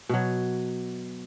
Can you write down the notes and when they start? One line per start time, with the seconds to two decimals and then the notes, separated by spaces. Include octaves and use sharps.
0.09 B2 F#3